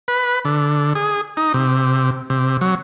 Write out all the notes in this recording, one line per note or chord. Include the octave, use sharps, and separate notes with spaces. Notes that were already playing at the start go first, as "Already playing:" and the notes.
B4
D3
G#4
D#4
C3
C3
F#3